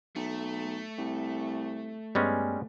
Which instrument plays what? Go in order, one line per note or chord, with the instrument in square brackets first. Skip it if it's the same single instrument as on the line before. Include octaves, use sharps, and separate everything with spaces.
[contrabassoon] B1 [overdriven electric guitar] A3
[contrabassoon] C2
[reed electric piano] G2 B3 [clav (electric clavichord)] G3 G#3 C#4